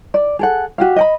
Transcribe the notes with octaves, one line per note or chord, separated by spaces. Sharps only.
D5
G#4 A4 F#5
F#4 G4 F5
D#5 G5 B5